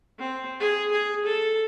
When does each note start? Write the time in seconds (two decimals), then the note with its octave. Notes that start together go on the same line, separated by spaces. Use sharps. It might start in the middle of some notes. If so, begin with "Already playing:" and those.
0.19 C4
0.60 G#4
0.91 G#4
1.25 A4